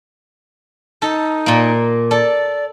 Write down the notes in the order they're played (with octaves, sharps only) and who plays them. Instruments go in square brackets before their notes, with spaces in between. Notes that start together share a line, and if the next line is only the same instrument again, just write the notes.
[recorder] D#4 [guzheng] A4
[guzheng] A#2 A#3
[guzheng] A4 [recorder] D5